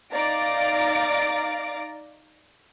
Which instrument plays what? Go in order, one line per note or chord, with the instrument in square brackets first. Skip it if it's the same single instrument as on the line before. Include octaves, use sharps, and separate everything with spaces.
[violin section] D#4 D5 F5 A#5 D6 D7